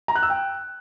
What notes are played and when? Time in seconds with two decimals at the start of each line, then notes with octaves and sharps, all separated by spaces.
0.08 A#5
0.16 F#6
0.23 E6
0.30 G5